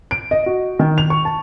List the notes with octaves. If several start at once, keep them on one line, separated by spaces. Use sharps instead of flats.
D7
D#5
F#4
D#3
F7
C#6
A5